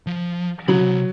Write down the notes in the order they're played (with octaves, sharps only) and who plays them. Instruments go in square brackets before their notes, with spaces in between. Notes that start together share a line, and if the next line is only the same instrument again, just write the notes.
[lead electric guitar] F3
[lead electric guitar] C3 B5 [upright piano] F#3